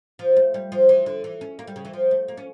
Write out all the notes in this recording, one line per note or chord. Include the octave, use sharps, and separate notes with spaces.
F3
A3
G3
F3
E3
D3
E3
C#4
A#3
G3
C#3
E3
F3
A3
A#3
C#4